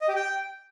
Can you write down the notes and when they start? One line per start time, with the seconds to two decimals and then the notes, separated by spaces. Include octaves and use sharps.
0.01 D#5
0.08 G4
0.16 G5